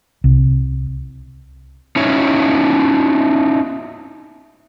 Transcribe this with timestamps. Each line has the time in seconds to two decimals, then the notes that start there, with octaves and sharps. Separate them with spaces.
0.24 C2
1.96 C#4 D#4 E4 C#5